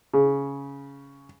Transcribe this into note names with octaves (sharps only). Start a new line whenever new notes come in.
C#3